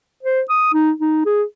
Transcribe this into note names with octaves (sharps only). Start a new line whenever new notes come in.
C5
D#6
D#4
D#4
G#4